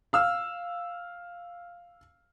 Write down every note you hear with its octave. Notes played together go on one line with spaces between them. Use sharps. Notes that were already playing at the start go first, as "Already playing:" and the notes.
F5 E6 F6